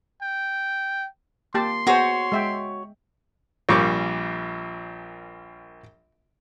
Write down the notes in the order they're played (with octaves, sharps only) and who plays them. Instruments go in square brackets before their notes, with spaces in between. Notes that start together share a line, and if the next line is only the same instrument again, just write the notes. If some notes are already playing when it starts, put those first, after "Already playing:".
[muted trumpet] G5
[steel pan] A#3 G4 A5 [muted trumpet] C6
[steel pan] B3 G#4 C5 [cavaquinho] F#4 C#5
[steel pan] G#3 E5 G5
[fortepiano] A#1 A#2 G3 C#6 D6